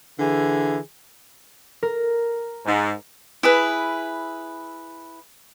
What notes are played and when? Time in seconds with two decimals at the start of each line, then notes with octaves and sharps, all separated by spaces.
0.20 D3 E3 G#4
1.83 A#4
2.66 G#2
3.43 E4 G#4 B4